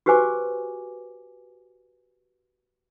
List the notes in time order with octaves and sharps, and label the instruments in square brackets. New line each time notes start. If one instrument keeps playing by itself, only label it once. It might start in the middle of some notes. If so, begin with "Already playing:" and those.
[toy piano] F#4 G4 B4 C5 G#5 D6